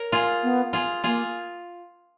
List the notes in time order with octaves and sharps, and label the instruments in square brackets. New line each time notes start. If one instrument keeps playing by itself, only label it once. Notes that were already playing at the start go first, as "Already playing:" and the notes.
Already playing: [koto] A#4 C#5
F4 G#4
[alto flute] B3
[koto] F4 G#4
[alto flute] A#3 [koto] F4 G#4